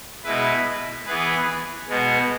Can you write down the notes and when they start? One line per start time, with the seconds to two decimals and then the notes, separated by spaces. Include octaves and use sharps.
0.24 B2 G#3 E4 B4
1.06 E3 B3 G#4 B4
1.89 B2 G#3 B3